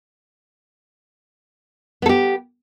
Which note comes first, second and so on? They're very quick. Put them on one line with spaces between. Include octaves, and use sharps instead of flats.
B3 A4 G4